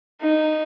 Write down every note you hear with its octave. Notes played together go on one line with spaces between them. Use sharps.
D#4